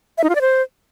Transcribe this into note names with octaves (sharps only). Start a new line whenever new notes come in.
E5
D#4
F4
D5
C5